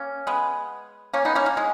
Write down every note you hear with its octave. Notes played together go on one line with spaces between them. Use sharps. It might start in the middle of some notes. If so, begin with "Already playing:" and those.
Already playing: A#3 C#4
G#3 B3
A#3 C#4
B3 D#4
A#3 C#4
A#3
G#3